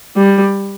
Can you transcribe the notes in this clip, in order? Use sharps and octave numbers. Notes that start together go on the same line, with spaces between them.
G3